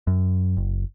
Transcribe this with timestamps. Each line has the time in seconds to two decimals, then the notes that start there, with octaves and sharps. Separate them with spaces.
0.07 F#2
0.57 F#1